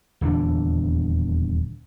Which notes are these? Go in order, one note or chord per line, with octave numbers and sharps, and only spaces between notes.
D#1 E2 D3 D4